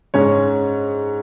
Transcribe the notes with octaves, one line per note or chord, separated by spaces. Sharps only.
G#2 G#3 C#4 C#5